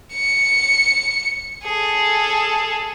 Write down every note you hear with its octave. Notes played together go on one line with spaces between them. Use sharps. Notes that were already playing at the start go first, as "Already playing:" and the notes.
C#7
G#4 A4